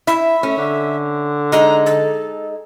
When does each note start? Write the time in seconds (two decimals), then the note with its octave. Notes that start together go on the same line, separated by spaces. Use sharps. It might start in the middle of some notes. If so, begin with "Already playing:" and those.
0.07 E4 E5
0.43 A3 C#4
0.58 D3
1.52 G#3 D#4 A#5
1.86 A4